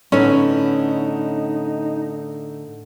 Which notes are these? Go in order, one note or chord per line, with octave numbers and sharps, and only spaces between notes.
A2 D3 B3 C#4 D#4